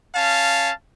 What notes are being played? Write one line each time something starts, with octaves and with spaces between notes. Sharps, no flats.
C#4 F5 A5